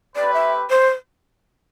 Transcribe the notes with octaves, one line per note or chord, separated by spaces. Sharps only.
A3 C4 G4 B4 D5
E5
C5